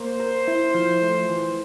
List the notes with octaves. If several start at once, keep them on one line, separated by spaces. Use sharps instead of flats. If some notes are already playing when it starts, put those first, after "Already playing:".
Already playing: A#3 C5
A#4
E4
F3
A3
E3